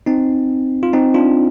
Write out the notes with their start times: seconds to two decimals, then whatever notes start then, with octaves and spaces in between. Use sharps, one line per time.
0.06 C4 D#4
0.83 F4
0.93 C4 D#4
1.14 D4 F4